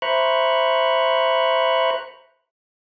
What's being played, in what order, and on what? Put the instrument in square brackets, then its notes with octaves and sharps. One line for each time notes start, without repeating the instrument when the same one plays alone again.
[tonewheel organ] C5 E5 A#5 B5 C#6 F#6